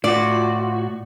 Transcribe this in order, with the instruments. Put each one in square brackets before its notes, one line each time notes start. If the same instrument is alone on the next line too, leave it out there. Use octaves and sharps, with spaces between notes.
[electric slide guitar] A2 F#4 [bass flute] F4 [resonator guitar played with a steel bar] D5